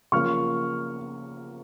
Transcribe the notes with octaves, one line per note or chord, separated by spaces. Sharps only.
C#3 F3 A#3 C#6 F6